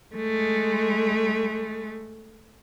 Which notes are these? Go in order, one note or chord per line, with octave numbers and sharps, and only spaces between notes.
G#3 A3